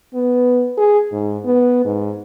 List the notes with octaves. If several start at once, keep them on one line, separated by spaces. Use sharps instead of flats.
B3
G#4
G#2
B3
G#2